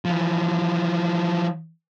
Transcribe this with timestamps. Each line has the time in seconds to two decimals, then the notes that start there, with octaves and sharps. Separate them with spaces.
0.05 E3 F3